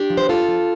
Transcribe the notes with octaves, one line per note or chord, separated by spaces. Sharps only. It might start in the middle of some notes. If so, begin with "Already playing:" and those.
Already playing: D4 G4
F3
C5
G2 F4 A4
F3